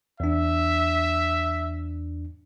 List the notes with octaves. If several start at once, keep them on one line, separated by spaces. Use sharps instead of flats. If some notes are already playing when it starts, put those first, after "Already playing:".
E2 D4 E5